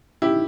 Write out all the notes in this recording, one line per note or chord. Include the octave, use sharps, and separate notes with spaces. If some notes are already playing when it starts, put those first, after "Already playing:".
E4 G4